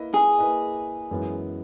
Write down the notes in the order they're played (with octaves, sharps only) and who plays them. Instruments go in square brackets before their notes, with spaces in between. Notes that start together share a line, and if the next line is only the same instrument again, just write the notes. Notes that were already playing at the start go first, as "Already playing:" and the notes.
Already playing: [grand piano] A#3 E4 B4 D#5
[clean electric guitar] G#4
[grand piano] A#3 E4 B4 D#5
F#2 E3 G#3 B3 E4